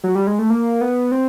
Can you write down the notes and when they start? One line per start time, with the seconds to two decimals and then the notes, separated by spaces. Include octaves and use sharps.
0.04 F#3
0.15 G3
0.27 G#3
0.39 A3
0.50 A#3
0.81 B3
1.12 C4